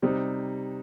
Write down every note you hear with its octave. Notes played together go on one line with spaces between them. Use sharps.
C3 G3 C4 D#4